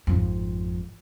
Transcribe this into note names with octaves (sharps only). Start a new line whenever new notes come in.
G#1 F2